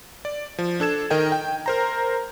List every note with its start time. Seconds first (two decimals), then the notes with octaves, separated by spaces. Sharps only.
0.25 D5
0.58 F3
0.80 D4 A4 G#6 E7
1.10 D#3 A#4 D#5 G5
1.32 G5
1.66 A#4 C5 A#5